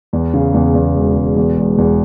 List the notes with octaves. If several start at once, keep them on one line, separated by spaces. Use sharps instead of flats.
E2
C#3
E2
E2
E1
E1
E2
E1
E2